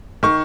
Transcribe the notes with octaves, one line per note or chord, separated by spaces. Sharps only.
D#3 C#6